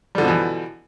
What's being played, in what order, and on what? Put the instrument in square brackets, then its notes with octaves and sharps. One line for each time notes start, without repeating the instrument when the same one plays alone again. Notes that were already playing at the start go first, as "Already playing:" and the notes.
[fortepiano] G3
D3
F3
B2
E3